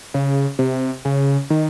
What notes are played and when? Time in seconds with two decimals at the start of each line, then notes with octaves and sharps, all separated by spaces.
0.14 C#3
0.59 C3
1.05 C#3
1.50 D#3